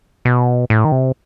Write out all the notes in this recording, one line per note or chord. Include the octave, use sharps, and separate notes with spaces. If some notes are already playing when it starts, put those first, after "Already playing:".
B2
A2
D#3
C3